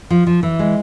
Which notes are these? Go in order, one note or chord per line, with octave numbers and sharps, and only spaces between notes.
F3
F3
E3
G#3